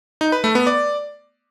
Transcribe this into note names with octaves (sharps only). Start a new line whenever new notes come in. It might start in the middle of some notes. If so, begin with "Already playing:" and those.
D#4
B4
A3
B3
D5